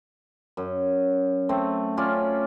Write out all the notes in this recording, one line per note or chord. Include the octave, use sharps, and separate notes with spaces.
F#2
A3 C4
C#4 F4 D5